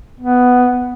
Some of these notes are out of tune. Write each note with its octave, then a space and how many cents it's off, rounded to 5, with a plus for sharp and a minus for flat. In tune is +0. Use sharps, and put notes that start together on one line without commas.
B3 +5